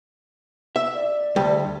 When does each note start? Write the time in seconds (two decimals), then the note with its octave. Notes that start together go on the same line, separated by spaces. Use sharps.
0.76 E5
0.94 D5
1.36 D2 G3